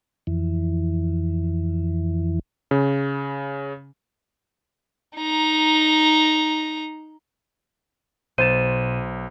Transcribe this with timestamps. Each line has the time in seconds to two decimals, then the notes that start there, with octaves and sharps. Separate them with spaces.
0.27 F2 E3
2.71 C#3
5.17 D#4 A#5
8.38 B1 B2 C5 A6 D#7 E7